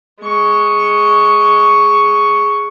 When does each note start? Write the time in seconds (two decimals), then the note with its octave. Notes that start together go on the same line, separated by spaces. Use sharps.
0.21 G#3 C#6